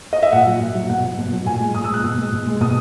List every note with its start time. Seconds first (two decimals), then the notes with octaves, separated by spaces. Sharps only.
0.13 D#5
0.23 E5
0.32 A#2 F#5
0.47 F#3
0.61 A#2
0.75 F#3
0.90 B2 F#5
1.05 F#3
1.18 B2
1.33 F#3
1.46 A#2 G#5
1.61 G#3
1.75 A#2 D#6
1.84 E6
1.89 G#3 F#6
2.04 B2
2.18 G#3
2.32 B2
2.46 G#3
2.61 B2 D#6